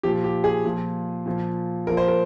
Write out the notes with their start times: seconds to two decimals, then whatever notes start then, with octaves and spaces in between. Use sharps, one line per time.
0.03 A#2 F3 G4
0.24 G4
0.44 G#4
0.65 A#2 F3
1.26 A#2 F3
1.87 A#2 F3 A#4
1.97 C5
2.08 A#4